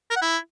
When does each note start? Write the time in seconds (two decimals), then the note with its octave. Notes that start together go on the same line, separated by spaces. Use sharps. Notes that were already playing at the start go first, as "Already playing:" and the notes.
0.11 A#4
0.16 F#5
0.22 E4